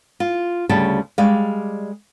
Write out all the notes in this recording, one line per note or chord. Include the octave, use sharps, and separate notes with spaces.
F4
D2 C#3 G3 A5
G3 G#3 D5 F5